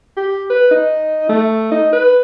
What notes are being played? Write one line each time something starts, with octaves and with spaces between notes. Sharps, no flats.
G4
B4
D#4
A3
D#4
B4